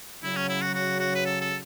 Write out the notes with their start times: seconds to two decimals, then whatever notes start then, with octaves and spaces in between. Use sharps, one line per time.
0.23 C#3 F#3 E4
0.36 C#4
0.49 E4
0.62 F#4
0.74 F#4
1.00 F#4
1.15 B4
1.25 A4
1.41 A4